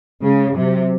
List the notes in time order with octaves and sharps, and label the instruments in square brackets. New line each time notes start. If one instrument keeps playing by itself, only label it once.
[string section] C#3 [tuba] G#3
[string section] C3 [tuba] F#3